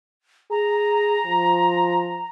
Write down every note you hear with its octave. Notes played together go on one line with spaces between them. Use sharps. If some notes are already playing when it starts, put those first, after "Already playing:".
G#4 A#5
F3